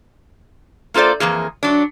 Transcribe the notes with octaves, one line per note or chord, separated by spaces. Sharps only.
A#3 F4 A4 C5 D5
F2 E3 A#3 G#4
F#3 D4